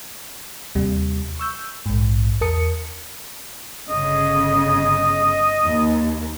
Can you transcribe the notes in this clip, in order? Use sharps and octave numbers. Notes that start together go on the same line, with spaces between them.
D#2 C3 G3
C#6 E6 G6
A#1 G#2
E2 A#4 A5 D#6 C#7
G1 C#3 D#5
D#2